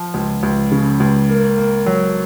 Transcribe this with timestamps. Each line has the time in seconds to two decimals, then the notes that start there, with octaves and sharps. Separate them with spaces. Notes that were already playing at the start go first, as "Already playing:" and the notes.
Already playing: F3
0.14 C#2
0.43 C#2
0.72 C#3
1.00 C#2
1.29 A#3
1.57 A#3
1.86 F#3